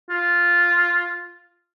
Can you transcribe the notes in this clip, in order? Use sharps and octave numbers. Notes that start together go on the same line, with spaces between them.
F4